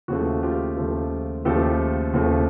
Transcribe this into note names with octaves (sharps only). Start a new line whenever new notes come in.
D#2 C#3 F3 A3 F#4
F4 G4
D#2 C#3 F3 A3
D#2 C#3 F3 A3 G4 A4
D#2 C#3 F3 A3